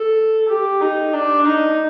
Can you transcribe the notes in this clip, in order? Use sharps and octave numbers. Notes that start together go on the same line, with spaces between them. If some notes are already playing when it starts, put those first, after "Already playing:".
Already playing: A4
G4
D#4
D4
D#4